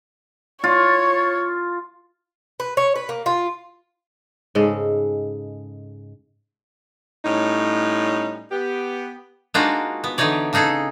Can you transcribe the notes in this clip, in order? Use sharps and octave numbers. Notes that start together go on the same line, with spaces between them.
F4 C#5
B4
C#5
B4
A#3
F4
G#2 C#3 G#3 A4
A2 G3 C#4 D#4
B3 G4
G#3 A#3 D4 D#4 F4 F#4
B3
D3 E3 D#4 C#5 D5
C#3 D4 D#4 G#4 A4